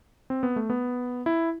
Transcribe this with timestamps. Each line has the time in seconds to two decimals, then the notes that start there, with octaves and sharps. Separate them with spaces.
0.30 C4
0.43 B3
0.56 A3
0.70 B3
1.26 E4